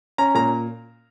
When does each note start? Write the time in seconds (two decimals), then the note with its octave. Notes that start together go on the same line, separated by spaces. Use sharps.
0.18 C#4 A#5
0.35 A#2 A#5